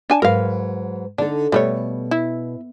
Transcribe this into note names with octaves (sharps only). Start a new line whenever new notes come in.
D4 G#5 A5
G#2 F#3 A#4 B4 F5
D3 D4 D#4 A4
B2 G3 A3 C#5
E4